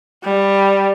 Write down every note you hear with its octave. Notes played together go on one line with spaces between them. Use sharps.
G3